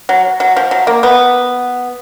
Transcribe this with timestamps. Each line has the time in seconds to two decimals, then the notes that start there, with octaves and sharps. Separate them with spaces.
0.09 F#3
0.40 F#3
0.57 F3
0.71 F#3
0.87 A#3
1.03 B3